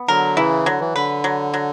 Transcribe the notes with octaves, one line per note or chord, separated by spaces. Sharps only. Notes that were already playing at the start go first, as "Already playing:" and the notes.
Already playing: B3
D3 F#3 A#4
C#3 E3 E4
D3 F#3
E3
D3 B4
F#3
F#3